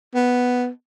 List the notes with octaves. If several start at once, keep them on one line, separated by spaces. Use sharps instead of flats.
B3